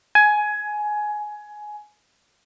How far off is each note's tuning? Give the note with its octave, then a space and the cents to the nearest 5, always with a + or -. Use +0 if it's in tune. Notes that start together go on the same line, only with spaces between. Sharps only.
G#5 +15